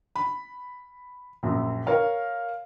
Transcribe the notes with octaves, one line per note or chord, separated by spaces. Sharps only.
B5
A#1 F#2
A#4 C#5 F5